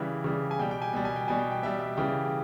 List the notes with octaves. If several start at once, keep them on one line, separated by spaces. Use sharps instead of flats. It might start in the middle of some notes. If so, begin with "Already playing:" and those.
Already playing: C#3 E3 G3 E5
C#3 E3 G3
G#5
B2 G3 G5
G5
G#5
B2 G3 G5
G#5
G5
B2 G3 G#5
G5
G5
B2 G3 E5
E5
C#3 E3 G3 G5